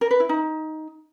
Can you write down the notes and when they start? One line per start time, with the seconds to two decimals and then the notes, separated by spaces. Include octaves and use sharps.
0.01 A#4
0.11 B4
0.20 E4
0.29 D#4